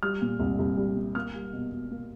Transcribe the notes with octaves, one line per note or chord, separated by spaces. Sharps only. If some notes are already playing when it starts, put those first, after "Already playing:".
G3 F6
A#2
C2
C2
G3
A#2
A#3 F6
G3
B2
B2
A#3